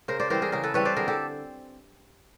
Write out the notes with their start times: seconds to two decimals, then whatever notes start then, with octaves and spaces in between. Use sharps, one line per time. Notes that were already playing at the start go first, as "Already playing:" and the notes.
0.08 C#3 A#4 C5
0.20 C5 D5
0.30 E3 G3 C4 A#4 C5
0.42 G#4 A#4
0.52 C#3 G#4 A#4
0.64 A4 B4
0.74 E3 G3 C4 B4 C#5
0.85 C5 D5
0.96 D3 G#4 A#4
1.08 G4 A4